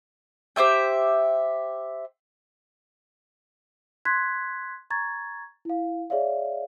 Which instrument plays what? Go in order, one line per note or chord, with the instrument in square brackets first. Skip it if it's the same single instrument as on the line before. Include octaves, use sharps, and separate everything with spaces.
[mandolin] G4 C5 E5 G5
[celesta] C6 F#6 G#6 B6
A#5 C#6 G#6 A6
E4 F5
G#4 C#5 D5 E5 F5